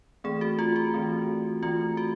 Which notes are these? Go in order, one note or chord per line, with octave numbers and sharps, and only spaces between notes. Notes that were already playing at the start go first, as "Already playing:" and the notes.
E3 A3 C4 G#4
F#4
F4
F#4
E3 A3 C4
E3 A3 C4 F4
F#4